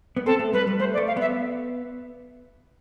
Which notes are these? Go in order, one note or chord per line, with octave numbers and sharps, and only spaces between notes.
B3
C4 A4
A3
G3 B4
G3
A3 C5
D5
A3
F5
B3 E5